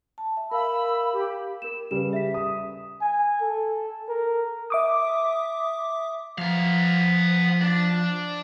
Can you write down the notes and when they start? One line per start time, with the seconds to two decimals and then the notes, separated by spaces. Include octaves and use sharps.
0.18 A5
0.37 E5
0.51 A#4 F5 B5 E6
1.13 G4
1.62 A#4 E7
1.91 C#3 G3 B4 E7
2.13 E5 B6
2.34 D#6
3.01 G#5
3.41 A4
4.09 A#4
4.70 E5 D6 D#6
6.38 F3 B3 F5
7.62 D4